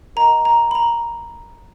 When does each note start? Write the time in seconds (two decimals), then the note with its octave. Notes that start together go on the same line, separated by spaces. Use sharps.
0.16 A#4 D#5 F#5 A#5
0.45 A#5
0.71 B5
0.75 A#5